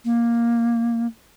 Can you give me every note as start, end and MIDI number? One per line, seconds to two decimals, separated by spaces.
0.05 1.07 58